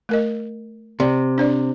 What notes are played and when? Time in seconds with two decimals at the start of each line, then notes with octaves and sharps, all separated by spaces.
0.09 A3 A#4 D#5
1.00 C3 D5
1.38 D4 C5 D5